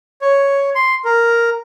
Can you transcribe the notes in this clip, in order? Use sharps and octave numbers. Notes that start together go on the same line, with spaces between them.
C#5
C6
A#4